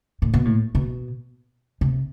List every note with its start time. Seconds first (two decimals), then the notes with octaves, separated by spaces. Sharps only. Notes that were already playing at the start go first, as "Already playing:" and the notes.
0.22 A2
0.34 B2
0.45 A2
0.75 B2
1.81 C3